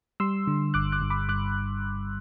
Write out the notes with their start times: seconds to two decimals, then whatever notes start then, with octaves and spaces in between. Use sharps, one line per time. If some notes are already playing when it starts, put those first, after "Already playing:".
0.20 G3 C6 E6
0.47 D3
0.74 G1 D6 F#6
0.92 D6 F#6
1.02 G2
1.10 B5 D6
1.29 G2 D6 F#6